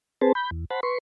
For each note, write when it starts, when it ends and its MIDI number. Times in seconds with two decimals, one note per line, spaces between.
0.21 0.32 60
0.21 0.32 68
0.21 0.32 71
0.21 0.32 72
0.21 0.32 81
0.35 0.50 83
0.35 0.50 91
0.51 0.65 40
0.70 0.80 72
0.70 0.80 78
0.70 0.80 81
0.70 0.80 83
0.83 0.98 71
0.83 0.98 84
0.83 0.98 85